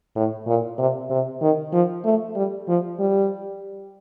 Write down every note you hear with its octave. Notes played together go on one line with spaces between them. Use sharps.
A2
A#2
C3
C3
D#3
F3
A3
G3
F3
G3